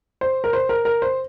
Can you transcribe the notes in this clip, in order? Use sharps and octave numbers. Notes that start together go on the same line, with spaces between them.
C5
A#4
C5
A#4
A#4
C5